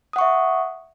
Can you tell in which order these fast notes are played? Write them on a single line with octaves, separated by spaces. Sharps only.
D#6 F#5 C#6 E5